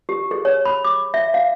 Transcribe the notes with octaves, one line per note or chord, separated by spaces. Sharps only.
G4
G#4
C#5
B5
D6
E5
F5